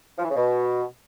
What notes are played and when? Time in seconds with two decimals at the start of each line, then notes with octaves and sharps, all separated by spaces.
0.18 F3
0.24 E3
0.30 C#3
0.36 B2